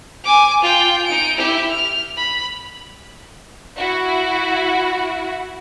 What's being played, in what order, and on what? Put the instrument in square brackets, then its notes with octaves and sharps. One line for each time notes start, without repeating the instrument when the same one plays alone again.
[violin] G#5 D6
F4 G5
D#4 D7
E4 G4
F6
B5
[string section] E4 F#4